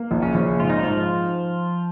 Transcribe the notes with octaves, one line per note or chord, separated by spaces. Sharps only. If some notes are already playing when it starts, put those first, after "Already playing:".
Already playing: A#3
A#1
C#3 C#4
A#1
G#2 F4
D#4
G#2 F3 F4